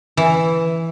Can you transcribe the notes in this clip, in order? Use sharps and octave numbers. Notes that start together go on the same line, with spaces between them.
E3